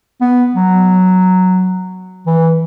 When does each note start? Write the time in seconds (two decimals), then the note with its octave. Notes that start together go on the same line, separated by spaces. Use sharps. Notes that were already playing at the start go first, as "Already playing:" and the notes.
0.21 B3
0.56 F#3
2.26 E3